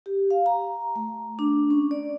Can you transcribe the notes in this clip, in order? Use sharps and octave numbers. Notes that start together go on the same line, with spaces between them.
G4
F5
A#5
A3
D4
C#4
D5